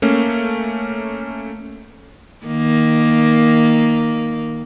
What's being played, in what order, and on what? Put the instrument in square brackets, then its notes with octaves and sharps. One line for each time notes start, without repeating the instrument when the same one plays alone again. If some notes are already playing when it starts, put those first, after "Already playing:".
[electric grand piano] A3 A#3 C#4
[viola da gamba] D#3 A#3